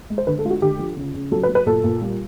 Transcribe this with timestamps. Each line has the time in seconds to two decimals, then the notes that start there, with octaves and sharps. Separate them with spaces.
0.10 G#3
0.18 C5
0.27 D3 B4
0.39 A4
0.44 G#3 F4
0.50 F#4
0.62 D3 G4
0.79 F3
0.97 C#3
1.14 C#3
1.32 F#3 A4
1.43 B4
1.49 F#3
1.55 B4
1.66 A#2 A4
1.84 A#2
2.01 G3